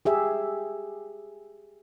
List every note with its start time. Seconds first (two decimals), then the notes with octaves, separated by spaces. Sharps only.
0.05 G4 G#4 E5